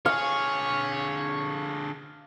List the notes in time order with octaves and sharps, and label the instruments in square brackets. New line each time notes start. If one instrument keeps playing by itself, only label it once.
[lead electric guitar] D3 G#4 [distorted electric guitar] C#5 [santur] F5